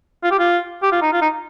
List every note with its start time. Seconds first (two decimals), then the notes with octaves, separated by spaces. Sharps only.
0.23 F4
0.31 G4
0.39 F4
0.83 G4
0.92 F4
1.02 D#4
1.13 F4
1.22 D#4